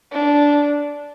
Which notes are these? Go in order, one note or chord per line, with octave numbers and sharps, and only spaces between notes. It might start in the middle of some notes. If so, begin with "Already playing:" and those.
D4